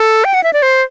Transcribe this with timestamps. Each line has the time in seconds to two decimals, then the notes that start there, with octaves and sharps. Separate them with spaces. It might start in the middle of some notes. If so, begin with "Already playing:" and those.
Already playing: A4
0.24 G5
0.34 F#5
0.44 E5
0.53 D5
0.62 C5